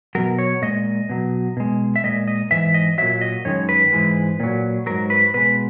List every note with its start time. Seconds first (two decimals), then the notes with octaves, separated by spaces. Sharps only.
0.15 B2 F#3 A#4
0.39 C#5
0.62 A#2 G#3 D#5
1.09 B2 F#3
1.57 B2 G#3
1.96 E5
2.04 A#2 G#3 D#5
2.28 D#5
2.51 G#2 E3 E5
2.74 D#5
2.98 A#2 F#3 E5
3.21 D#5
3.45 F#2 D#3 G#3 C#5
3.69 B4
3.92 G#2 E3 G#3
4.40 A#2 F#3
4.86 G#2 F#3 A#4
5.10 B4
5.34 B2 G#3 B4